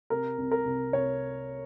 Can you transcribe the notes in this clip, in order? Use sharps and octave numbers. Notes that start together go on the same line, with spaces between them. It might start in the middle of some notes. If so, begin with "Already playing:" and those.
C3 A#4
C2
A#4
C2
C2 C#5